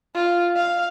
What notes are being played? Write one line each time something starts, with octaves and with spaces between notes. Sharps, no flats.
F4
F5